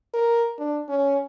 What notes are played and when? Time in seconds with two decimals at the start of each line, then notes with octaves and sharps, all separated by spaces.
0.14 A#4
0.58 D4
0.88 C#4